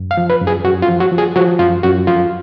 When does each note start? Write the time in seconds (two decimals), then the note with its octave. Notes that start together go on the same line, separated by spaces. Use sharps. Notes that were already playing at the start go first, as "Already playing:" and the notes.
Already playing: F#2
0.11 F5
0.17 F3
0.30 B4
0.41 F#2
0.47 G#4
0.64 F#2 F#4
0.82 F4
0.88 F3
1.00 F#4
1.12 F3
1.18 G#4
1.36 F3 F#4
1.59 F#2 F4
1.83 F#2 F#4
2.07 F3 F4